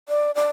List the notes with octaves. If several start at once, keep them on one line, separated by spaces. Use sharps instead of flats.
D5
D5